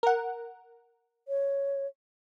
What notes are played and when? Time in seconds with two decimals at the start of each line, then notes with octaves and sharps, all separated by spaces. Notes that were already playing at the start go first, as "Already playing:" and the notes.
0.03 A#4 F#5
1.28 C#5